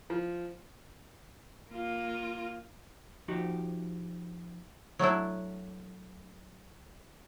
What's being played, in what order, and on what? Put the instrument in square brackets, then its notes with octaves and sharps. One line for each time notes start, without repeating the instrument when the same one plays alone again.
[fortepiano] F3
[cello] A#3 F4
[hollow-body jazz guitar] F3 D#4 F#4 G4
[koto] F#3 A3 D4 E4